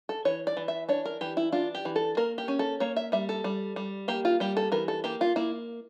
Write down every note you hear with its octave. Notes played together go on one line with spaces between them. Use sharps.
A4
E3 C#5
D5
E3
E5
D4 C#5
A#4
E3 G4
E4
D4 F4
G4
E3
A4
A#3 A#4
G4
C#4
A4
A#3 C#5
E5
G3 E5
A4
G3
G3
A#3 G4
F4
G3 G4
A4
E3 A#4
A4
A#3 G4
F4
A#3 E4